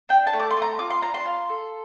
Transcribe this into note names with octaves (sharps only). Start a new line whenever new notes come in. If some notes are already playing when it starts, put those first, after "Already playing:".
D4 G5
A5
A3
D6
C6
A3
A#5
F4 D6
C6
D4 A#5
C6
F4
A4